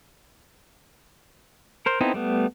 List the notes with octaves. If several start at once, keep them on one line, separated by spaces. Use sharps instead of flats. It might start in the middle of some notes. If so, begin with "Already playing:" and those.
A#4 C5
B3 C4 D#4 E4 A4
G3 A3 B3